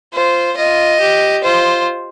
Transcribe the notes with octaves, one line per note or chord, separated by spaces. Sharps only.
F4 C5
F4 D#5
G4
F4 C5